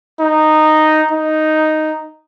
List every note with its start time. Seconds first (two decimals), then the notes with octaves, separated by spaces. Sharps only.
0.20 D#4
1.11 D#4